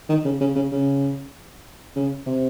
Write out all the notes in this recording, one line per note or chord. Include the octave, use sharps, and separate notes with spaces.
D#3
C#3
C#3
C#3
C#3
C#3
C3